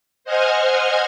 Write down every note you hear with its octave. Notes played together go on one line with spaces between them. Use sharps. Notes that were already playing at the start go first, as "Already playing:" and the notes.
C5 D#5 F#5 G#5 F6 G#6